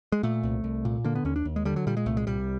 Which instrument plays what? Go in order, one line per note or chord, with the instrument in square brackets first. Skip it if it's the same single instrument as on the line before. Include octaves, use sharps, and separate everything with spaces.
[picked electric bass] G#3
A#2 A3
C2
C2
A#2
D3 A#3
B3
D#2 C#4
D4
D#2
G#3
D3 G3
F#3
A#2 G3
G#3
C2 A3
G#3
C2 G3